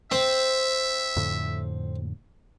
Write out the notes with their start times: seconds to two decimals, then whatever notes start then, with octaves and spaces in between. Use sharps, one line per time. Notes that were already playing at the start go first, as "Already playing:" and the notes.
0.11 C4 E5
1.17 F2 A2 D3